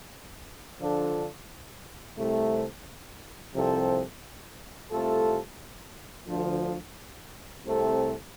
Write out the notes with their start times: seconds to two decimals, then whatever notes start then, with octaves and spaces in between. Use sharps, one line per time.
0.79 D3 F3 D4 F4 A4
2.16 C2 C3 A3
3.53 C2 C3 F3 C4 A4
4.90 C2 C3 A3 F4 A4
6.27 D2 D3 F3
7.65 C2 C3 A3 C4 A4